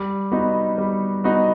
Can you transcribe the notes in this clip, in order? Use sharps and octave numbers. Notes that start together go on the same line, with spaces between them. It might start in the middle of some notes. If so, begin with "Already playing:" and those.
Already playing: G3
B3 D#4 F#4
G3
B3 D#4 F#4